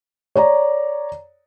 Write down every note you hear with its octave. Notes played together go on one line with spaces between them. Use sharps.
C#5 D5 A#5